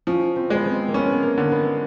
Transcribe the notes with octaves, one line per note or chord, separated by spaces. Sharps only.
F3 C#4
C4
G#3 B3
C4
A#3
B3 C#4
B3
A#3
D3
B3